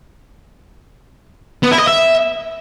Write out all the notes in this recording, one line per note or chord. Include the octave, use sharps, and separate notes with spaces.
B3
E4
D#5
E5